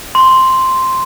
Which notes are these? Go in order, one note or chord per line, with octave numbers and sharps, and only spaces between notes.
C6